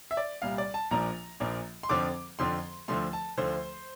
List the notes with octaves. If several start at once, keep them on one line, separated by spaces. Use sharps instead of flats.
E5
D5
C2 A#2 G3 F5
D5
A5
A#1 A#2 F3 A#3 D4 A#5
A#1 A#2 F3 A#3 D4
C6
F2 D3 F3 C4 D6
F2 D3 F3 C4 C6
D2 D3 F3 A3 C6
A5
D2 D3 F3 A3 C5